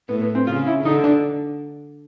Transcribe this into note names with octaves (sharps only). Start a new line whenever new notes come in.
A2 B3
B3
C4
C#3 F4
E4
D3 D#4
D4